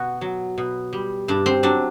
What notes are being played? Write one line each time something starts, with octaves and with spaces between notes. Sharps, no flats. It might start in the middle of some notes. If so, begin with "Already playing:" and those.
Already playing: B2 F#4
F#3
B2
G3
G2 D4
C4
F#3 D4